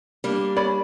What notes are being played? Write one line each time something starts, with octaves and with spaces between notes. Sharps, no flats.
G3 A#3 D4
C#5 D5 B5